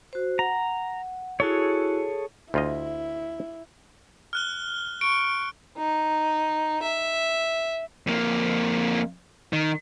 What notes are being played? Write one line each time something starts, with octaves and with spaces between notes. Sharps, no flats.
F#4 C5
F#5 A#5
E4 F#4 G#4 A4 C#5
D2 E4 F4 D#5
F6 F#6 G7
C#6 D7
D#4
E5
F2 A#3
D#3